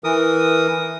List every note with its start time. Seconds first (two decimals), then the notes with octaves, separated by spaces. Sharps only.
0.04 E3 A#4 D#6